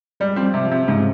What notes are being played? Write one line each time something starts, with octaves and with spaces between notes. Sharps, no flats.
G3 G#3
F3 C4
G3
C3
F3
C3
G#2 C#3